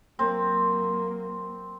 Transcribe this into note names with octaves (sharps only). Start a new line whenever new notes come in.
F#3 A#3 C4